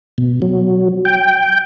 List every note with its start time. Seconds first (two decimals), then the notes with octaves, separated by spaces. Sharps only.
0.18 B2
0.42 F#3
1.05 G5